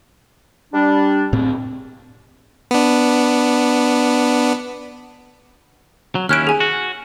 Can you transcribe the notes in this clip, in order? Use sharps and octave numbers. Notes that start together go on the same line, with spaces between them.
G3 D4
A2 C4
B3 D4
F#3
D#2 C#4 E4 F6 F#6 D7
G#4 G#5
F#4